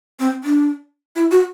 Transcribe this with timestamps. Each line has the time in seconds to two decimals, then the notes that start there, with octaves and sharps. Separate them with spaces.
0.20 C4
0.44 D4
1.16 E4
1.31 F#4